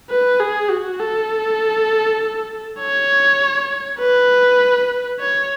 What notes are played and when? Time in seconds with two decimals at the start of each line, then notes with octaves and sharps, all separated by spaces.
0.10 B4
0.40 G#4
0.70 F#4
1.00 A4
2.80 C#5
4.00 B4
5.20 C#5